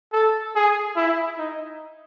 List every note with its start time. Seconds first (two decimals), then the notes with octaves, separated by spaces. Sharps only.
0.13 A4
0.55 G#4
0.96 E4
1.38 D#4